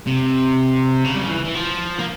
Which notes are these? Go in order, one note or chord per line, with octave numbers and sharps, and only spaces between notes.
C3
C#3
G3
F3
E3
E3
F3
A#3